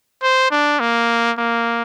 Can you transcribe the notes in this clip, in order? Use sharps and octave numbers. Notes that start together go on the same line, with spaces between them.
C5
D4
A#3
A#3